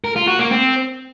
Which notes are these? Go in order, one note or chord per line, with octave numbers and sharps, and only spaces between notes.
A#4
F4
F#4
A#3
C4